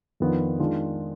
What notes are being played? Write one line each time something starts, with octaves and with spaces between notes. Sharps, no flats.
F2 D#3 B3 D4 F4
D#3 G#3 D4 F4